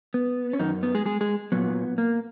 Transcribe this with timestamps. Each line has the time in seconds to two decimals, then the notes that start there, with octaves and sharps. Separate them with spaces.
0.14 B3
0.53 C#4
0.59 F#2 D#3 D#4
0.83 B3
0.95 G#3 G#4
1.05 G#3 G#4
1.21 G#3 G#4
1.52 A#2 F#3 B3
1.98 A#3